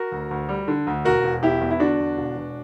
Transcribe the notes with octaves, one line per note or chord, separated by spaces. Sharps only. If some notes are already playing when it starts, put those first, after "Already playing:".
Already playing: F#4 A#4
D2
D2
G3
D3
D2
E1 F#4 A#4
E1
E2 E4 G4
E2
E4
D3 D4 F#4
E2
E1
E1